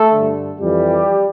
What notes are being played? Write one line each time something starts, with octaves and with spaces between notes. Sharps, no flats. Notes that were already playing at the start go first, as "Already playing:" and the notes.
Already playing: A3 A4
G2 D3
F2 E3 G3 G4